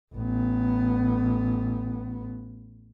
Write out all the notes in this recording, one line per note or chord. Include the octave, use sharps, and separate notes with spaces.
A1 B3